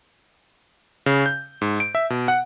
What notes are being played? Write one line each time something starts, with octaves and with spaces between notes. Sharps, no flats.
C#3
G6
G#2
D7
E5
B2
F#5